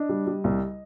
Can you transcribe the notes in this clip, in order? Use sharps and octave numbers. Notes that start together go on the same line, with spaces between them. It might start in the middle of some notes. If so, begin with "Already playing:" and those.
Already playing: D4 D#5
G3
G3
C2